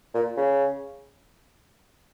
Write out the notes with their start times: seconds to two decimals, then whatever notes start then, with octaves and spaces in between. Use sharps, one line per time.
0.14 A#2
0.37 C#3